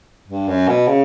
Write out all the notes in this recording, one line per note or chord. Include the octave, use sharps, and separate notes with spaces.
G2
F#2
B2
C#3